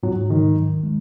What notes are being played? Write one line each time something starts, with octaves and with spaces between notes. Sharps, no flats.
G#2 F#3
D#3 F#3
D#3
G#3